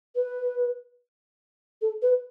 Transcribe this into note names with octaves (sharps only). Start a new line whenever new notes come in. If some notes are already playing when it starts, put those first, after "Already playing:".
B4
A4
B4